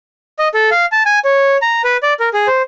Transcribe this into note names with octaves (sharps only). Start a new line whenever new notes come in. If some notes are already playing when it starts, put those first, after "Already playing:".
D#5
A4
F5
A5
G#5
C#5
A#5
B4
D5
A#4
G#4
C5